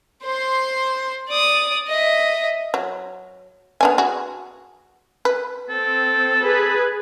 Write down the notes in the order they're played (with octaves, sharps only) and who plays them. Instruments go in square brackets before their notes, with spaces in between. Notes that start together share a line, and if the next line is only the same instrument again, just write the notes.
[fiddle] C5 C6
D5 D#6
D#5 E5
[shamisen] F#3
B3 D4 G#5
F#4 G#4
B4
[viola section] C4 [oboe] A4
[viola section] G#4 B4